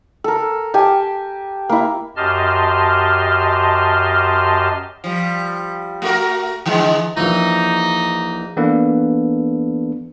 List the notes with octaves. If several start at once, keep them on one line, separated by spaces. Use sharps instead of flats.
A4 A#4
G4 G#5 A5
A#3 E4
F#2 G4 D#5 A5 C6 F6
F3 G3
A3 F#4 A#4
D3 E3 G#3
A#1 E3 D#4
E3 A#3 B3 D4 A4 B4